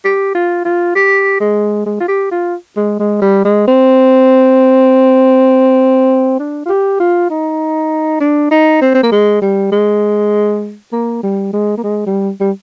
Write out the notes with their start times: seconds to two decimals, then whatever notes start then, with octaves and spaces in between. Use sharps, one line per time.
0.05 G4
0.35 F4
0.65 F4
0.95 G4
1.41 G#3
1.86 G#3
2.00 F4
2.09 G4
2.31 F4
2.76 G#3
2.99 G#3
3.22 G3
3.45 G#3
3.68 C4
6.39 D4
6.66 F4
6.69 G4
7.00 F4
7.30 D#4
8.20 D4
8.51 D#4
8.81 C4
8.95 C4
9.03 A#3
9.12 G#3
9.41 G3
9.72 G#3
10.92 A#3
11.23 G3
11.53 G#3
11.78 A#3
11.83 G#3
12.06 G3
12.40 G3